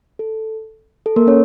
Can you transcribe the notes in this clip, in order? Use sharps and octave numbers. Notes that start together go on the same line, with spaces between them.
A4
A4
A#3 A#4
C#4 C#5